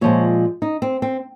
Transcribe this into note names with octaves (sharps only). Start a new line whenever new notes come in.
A#2 F3 G#3 C#5
D#4
C4
C4